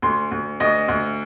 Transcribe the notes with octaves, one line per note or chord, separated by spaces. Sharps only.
D2 C6
D2
D2 D#5
D2